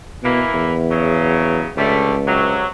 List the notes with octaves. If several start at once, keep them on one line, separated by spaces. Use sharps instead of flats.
B2 E3 A#3 E4
E2
C#3 F#3
C#2 D3 G3 A3
G2 C3 F#3